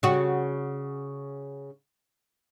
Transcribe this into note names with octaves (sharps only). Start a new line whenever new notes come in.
C#3 F#4